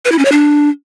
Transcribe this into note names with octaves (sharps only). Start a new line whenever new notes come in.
B4
E4
C#4
C#5
D4